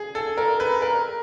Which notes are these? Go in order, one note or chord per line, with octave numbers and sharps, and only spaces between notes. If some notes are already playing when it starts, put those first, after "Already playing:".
Already playing: G#4
A4
A#4
B4
A#4